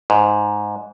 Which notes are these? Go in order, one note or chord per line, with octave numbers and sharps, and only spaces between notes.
G#2